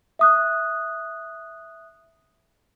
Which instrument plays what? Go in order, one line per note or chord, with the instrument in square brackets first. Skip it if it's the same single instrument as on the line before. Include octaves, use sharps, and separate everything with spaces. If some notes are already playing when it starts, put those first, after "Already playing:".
[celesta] E5 D#6 F#6